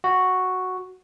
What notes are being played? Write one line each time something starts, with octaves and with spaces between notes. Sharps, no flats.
F#4